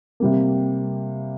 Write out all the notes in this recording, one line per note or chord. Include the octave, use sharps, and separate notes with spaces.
C3 G3 A#3